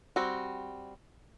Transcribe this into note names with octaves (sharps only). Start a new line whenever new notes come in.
G3 C4 F#4